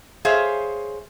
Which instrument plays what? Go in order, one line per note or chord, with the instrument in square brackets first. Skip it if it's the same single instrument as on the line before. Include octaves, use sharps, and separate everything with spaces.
[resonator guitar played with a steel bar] G#4 C5 C#5 E5 F5